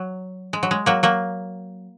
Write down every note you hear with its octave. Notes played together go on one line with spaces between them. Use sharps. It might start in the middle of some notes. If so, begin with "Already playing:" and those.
Already playing: F#3
G#3
F#3
G#3
F#3 A#3
F#3 A#3